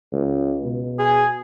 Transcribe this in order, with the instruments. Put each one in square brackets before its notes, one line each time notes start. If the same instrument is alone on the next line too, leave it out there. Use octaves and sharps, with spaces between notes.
[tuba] C#2
B2
[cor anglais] G#4